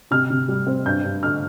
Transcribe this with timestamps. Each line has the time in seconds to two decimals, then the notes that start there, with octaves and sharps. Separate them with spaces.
0.11 C3 F6
0.30 C3
0.48 G3
0.67 C4
0.86 G2 G6
1.04 G2
1.23 D3 F6